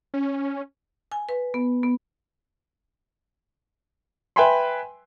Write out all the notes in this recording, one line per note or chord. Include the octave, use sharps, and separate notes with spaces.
C#4
G#5
B4
B3
B3
B4 E5 G5 G#5 B5 C6